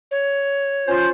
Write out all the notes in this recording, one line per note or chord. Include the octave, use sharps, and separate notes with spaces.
C#5
C#4 F4 C5